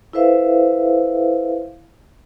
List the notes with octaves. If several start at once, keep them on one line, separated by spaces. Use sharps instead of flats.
E4 A4 B4 C5 E5 F5